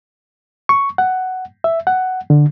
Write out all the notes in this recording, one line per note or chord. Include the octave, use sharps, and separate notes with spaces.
C#6
F#5
E5
F#5
D3